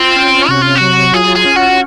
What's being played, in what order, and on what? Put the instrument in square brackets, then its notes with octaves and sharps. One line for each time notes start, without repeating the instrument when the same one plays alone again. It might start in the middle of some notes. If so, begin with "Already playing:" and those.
Already playing: [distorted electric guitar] C4 [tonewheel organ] F4
[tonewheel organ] C#4
[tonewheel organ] C3 [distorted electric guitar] F#4
[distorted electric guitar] F4
F#4
[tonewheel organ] F#3
[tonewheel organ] F4 [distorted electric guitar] G#4
[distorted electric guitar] G#4
[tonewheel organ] C#4
[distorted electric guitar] F#4